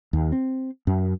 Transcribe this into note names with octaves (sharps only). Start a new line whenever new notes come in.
D#2
C4
F#2